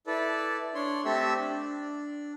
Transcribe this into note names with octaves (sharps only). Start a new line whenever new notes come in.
E4 A4 B4 D5
D4 C#5 C6
A3 C4 G4 A4 E5 E6
D4